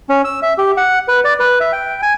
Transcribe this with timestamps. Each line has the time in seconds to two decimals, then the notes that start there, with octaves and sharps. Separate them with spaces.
0.09 C#4
0.25 E6
0.43 E5
0.58 G4
0.77 F#5
1.08 B4
1.25 D5
1.40 B4
1.60 E5
1.72 G5
2.02 G#5